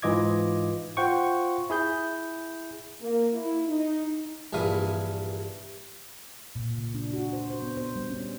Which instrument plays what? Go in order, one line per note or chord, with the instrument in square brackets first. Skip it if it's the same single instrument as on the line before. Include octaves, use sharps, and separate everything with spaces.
[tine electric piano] G#2 E3 F4 D#5 D6 G#6
F4 C5 F#5 G5 C#6
E4 G#4 G6
[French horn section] A#3
E4
D#4
[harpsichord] A#1 G2 E3 F5 D#6
[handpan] A#2
C#3
D4
F#4
C5
C5
B3
C5
G3
C#4